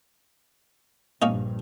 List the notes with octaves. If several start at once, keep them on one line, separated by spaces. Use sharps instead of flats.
A#1 G2 A#3 C#4 D#4